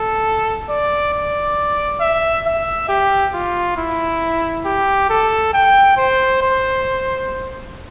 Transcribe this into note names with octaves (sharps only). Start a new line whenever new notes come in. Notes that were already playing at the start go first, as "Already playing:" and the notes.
Already playing: A4
D5
D5
E5
E5
G4
F4
E4
G4
A4
G5
C5
C5